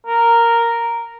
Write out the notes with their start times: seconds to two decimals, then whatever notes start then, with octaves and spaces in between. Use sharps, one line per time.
0.07 A#4